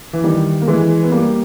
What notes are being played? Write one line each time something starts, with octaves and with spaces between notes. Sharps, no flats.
E3
D#3 G3
A#3
E3 G#3
B3
G3 A#3